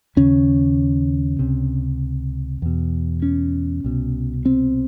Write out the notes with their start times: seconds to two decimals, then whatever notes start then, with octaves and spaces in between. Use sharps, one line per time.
0.16 D#2 C#3 C#4
1.39 C#2 C3
2.62 E2 B2
3.22 C#4
3.84 C2 B2
4.46 C4